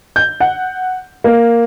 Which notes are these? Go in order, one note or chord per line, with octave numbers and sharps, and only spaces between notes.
G6
F#5
A#3